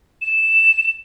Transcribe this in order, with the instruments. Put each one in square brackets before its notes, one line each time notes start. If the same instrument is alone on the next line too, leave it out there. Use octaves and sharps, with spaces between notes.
[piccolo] E7